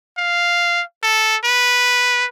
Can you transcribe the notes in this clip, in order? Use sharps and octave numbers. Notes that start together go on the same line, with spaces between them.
F5
A4
B4